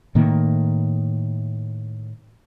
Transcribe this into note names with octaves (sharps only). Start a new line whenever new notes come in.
A2 D#3 A#3